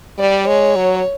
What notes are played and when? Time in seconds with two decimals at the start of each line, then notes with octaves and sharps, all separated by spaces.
0.19 G3 D5
0.48 G#3 C#5
0.76 F#3